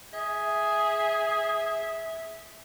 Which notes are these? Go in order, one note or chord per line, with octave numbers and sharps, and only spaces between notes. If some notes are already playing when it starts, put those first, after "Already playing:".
G#4 E5